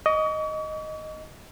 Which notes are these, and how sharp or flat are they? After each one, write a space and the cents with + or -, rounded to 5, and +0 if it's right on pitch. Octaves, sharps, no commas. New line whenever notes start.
D#5 +0 C#6 +45